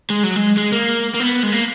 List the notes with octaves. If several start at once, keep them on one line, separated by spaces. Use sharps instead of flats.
G#3
F#3
G#3
G#3
A#3
A#3
B3
G#3
A#3